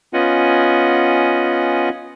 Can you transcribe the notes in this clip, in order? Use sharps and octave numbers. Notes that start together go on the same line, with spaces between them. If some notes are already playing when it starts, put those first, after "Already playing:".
B3 C#4 F4 D#5 F#5 G#5